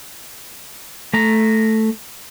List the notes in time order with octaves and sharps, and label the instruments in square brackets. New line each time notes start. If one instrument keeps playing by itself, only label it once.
[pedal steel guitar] A3 A#5